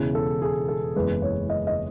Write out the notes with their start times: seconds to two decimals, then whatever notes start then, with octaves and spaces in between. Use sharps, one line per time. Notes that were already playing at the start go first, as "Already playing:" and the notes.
Already playing: E1 E2 C#3 E3
0.15 A4
0.42 G#4
0.68 A4
0.96 F#1 E2 C#3 G#3 B4
1.22 C#5
1.50 D#5
1.67 D#5